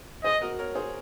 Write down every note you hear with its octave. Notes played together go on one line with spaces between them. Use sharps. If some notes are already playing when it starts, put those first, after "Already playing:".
G#4 C5 D#5
F#4 A#4
A#4 C#5
G#4 C5